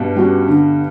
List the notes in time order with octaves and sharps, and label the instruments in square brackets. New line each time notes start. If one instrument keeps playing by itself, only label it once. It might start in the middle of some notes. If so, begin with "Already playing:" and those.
Already playing: [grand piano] G2 B2
[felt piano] G3 C#4 F#4
D3